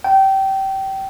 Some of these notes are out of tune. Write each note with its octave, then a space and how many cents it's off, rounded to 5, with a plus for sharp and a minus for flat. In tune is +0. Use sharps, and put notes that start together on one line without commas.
G5 -20